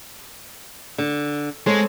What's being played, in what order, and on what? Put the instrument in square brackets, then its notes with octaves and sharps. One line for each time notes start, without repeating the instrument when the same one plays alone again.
[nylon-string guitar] D3
[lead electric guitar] G#3 [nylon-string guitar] C4 A4 C#5